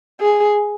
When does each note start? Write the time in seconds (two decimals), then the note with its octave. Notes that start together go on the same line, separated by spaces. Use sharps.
0.21 G#4